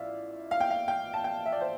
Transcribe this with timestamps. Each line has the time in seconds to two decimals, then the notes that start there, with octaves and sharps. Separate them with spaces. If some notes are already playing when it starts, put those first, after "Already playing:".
Already playing: A1 A2 F3 D5 E5 F5
0.51 F5
0.61 G5
0.70 F5
0.88 G5
1.14 A5
1.24 G5
1.46 E5
1.52 D5
1.61 C5